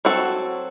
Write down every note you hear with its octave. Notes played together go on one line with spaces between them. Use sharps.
F#3 C4 F#4 A4